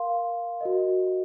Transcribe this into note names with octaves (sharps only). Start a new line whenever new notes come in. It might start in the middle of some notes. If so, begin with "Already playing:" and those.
Already playing: A#4 F5 C6
F#4 A#4 D#5